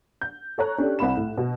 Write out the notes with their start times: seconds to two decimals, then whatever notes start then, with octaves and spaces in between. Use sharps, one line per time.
0.21 G6
0.58 A4 C#5 A#5 F#6
0.78 C#4 D4 G4 A4
0.99 C2 C4 B5 E7
1.17 A2
1.38 B2